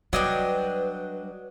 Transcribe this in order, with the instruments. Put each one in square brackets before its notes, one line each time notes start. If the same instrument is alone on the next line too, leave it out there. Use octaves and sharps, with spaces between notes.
[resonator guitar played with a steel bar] F#3 [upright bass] G3 [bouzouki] D4 D#5 G5 [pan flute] B4